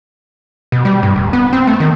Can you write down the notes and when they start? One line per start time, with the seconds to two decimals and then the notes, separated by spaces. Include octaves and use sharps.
0.72 B2
0.85 G3
1.03 G2
1.16 D1
1.33 B3
1.53 C4
1.67 A3
1.80 D#3